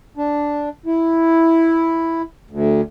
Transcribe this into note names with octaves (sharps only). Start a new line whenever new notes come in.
D4
E4
D2